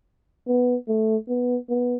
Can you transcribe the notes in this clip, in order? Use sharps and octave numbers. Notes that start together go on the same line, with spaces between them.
B3
A3
B3
B3